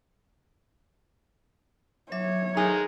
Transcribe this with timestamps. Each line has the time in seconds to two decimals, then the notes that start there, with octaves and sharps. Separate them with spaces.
2.12 F#3 C#5 E5 D6
2.57 D#3 G#3 G#4 A#5